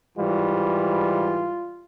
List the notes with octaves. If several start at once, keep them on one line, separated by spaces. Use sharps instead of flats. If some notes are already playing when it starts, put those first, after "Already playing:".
G#2 E3 G3 F4